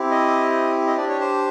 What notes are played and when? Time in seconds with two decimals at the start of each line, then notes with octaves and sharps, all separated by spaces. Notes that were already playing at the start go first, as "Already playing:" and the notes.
Already playing: C4 E4 G4
0.11 D#5
0.87 D#5
0.97 D4 D5
1.02 G4
1.09 C#5
1.21 C5